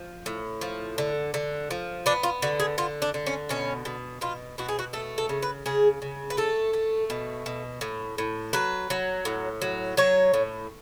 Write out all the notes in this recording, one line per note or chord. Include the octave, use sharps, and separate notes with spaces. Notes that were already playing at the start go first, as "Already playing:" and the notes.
Already playing: F3
A2
F3
D3
D3
F3
B3 D4
F4
D3 F#4
G#4
D3 F4
D4
D3
C#4
B2 C#4
B2
B2 F4
B2 F#4
G#4
F#4
A3 A4
A4
C#3
B4
C#3 G#4
C#3
B4
A3 A4
A3
B2
B2
A2
A2
F#3 B4
F#3
A2
F#3
F#3 C#5
A2